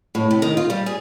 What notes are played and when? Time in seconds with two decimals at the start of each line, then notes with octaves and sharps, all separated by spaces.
0.15 A2
0.31 C3
0.42 D#3
0.57 F4
0.70 G3
0.86 G#4